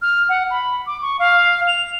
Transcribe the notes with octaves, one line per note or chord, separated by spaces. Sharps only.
F6
F#5
B5
D6
C#6
F5
F7